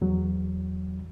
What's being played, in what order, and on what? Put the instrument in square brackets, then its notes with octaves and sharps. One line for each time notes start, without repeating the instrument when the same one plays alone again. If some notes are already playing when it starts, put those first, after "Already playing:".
[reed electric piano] E2 F#3